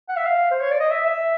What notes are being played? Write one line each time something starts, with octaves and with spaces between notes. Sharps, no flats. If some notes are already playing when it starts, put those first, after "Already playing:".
F#5
E5
F5
C5
C#5
D5
D#5
E5
E5